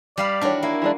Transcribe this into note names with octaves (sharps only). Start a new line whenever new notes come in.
G3 D5 F5 B5
D#3 E3 D4 F#4 C#5
A#3 E4
E3 G#3 D4